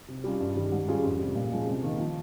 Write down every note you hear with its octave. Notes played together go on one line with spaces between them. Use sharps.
C3
G3 C#4 F4
G2
D#3 G3
G#2
G3 C#4 F4 G#4
F2
C3 G3
A#2
F3 G#3 C#4
C3
D#3 A#3
F3